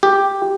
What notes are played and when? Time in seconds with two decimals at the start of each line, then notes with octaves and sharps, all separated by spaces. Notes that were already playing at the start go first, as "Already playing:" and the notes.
0.03 G4